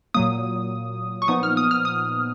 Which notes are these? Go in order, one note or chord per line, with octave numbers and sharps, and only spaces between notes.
A#2 F#3 A#3 D#6
C#6
A#2 F3 B3 D#4 D#6
F6
D#6
F6
D#6